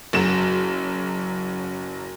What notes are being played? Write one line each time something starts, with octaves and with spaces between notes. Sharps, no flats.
F#1 F#3 E7